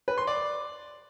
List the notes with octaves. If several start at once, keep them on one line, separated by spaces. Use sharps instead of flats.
B4
C6
D5